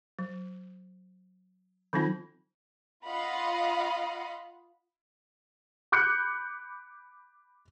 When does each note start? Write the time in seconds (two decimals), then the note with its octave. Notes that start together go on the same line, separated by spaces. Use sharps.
0.19 F#3
1.93 D#3 F#3 C4 D#4 F4
3.06 F4 D#5 F5 F#5 B5
5.92 B5 D6 F#6 G6 C#7